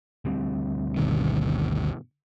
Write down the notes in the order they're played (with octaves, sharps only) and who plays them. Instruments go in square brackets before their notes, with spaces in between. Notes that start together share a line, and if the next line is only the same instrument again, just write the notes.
[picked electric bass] D2 G3 C4
[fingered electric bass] G1 B2 D#3